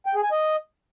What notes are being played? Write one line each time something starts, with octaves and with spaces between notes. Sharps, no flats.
G5
G#4
G#5
D#5